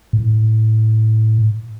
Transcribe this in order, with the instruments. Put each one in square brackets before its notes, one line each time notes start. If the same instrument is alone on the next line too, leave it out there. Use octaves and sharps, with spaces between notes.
[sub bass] A2